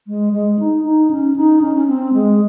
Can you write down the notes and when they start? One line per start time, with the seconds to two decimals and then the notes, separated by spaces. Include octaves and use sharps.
0.08 G#3
0.33 G#3
0.59 D#4
0.85 D#4
1.11 C#4
1.36 D#4
1.62 C#4
1.75 C#4
1.87 C4
2.13 G#3